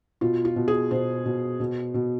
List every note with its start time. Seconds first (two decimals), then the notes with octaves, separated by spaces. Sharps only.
0.21 B2 F4
0.45 F4
0.56 B2
0.68 G#4
0.91 B2 C5
1.25 B2
1.60 B2
1.94 B2